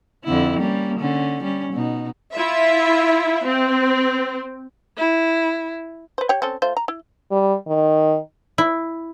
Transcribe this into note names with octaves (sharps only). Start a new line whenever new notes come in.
F2 D3 E4
G3 A#3 C#4
D3 C#4
G3 C#4
B2 D#4
E4 F4 E5
C4
E4
B4 C5
G4 C#5 G5
C4 C#4 A4
A3 F4 C5
A#5
E4
G3
D#3
E4